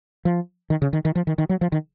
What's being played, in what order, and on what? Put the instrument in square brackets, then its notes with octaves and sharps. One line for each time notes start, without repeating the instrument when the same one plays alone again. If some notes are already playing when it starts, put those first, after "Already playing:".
[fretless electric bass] F3
D#3
C#3
D#3
D#3
F3
D#3
D#3
F#3
F3
D#3